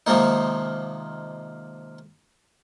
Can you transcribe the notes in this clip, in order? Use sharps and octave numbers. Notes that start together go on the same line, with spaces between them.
C3 D#3 F3 G#3 A#3 D#4